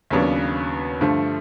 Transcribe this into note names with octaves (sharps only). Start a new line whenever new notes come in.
D#2 C#3 F#3 B3 D4
G2 D3 F3 A3